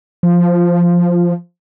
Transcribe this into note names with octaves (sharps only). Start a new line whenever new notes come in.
F3